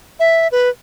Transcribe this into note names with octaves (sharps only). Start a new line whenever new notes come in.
E5
B4